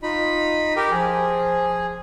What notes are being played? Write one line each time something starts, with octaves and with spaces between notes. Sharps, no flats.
D#4 F4 B5
G4 A#4
F3 G#4